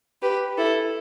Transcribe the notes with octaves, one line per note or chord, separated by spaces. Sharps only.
G4 B4
E4 A4